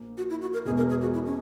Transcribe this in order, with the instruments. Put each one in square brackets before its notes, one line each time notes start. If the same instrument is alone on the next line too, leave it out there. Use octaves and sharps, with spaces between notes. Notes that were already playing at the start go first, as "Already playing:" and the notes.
Already playing: [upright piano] A#1 A#3
[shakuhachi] F#4
E4
F#4
A#4
[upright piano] E1 E2 B2 G#3 [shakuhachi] G#4
[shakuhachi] A#4
G#4
F#4
E4
C#4